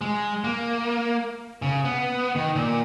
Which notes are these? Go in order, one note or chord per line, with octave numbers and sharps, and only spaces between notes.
G#3
A#3
C#3
B3
D#3
A#2